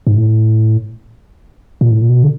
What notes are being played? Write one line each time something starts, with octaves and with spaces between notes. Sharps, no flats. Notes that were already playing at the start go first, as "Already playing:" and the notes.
G#2
A2
A#2
A2
A#2
B2
D3